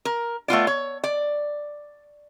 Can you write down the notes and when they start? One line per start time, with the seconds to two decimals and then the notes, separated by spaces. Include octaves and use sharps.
0.05 A#4
0.48 A3 B3 F4 D5
0.67 C#5
1.04 D5